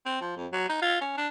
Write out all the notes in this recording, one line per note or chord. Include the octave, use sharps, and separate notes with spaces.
C4
F3
F2
F#3
D#4
F4
C#4
D4